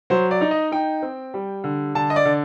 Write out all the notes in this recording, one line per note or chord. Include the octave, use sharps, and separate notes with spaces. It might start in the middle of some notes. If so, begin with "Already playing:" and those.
F#3 C5
D5
D#4
D#5
D#4 G5
C4
G3
D3
D3 A5
D#5
D5
D3